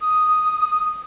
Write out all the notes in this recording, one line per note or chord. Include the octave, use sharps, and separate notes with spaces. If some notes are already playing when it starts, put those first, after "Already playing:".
D#6